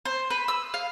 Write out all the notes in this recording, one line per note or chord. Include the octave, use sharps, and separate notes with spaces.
C5
B4
E6
F5